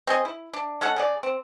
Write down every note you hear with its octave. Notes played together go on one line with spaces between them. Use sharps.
C4 G#4 D#5
E4
D4
G#3 C#4 A4 F#5
C#3 G#4 D5
C4